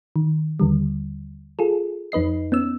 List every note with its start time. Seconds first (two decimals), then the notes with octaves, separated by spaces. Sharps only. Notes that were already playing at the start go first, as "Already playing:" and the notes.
0.16 D#3
0.60 D#2 D3 G3
1.59 F4 G#4 A4
2.12 F2 D#4 B4 D#5 C7
2.52 B3 C#4 E6